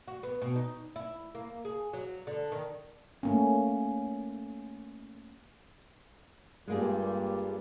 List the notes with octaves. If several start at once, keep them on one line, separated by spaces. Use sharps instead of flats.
F#4
B3
B2
D#4
E4
A#3
G#4
F#3
D3
D#3
A3 A#3 C#4
G2 A#2 G3 G#3 A#3 G#4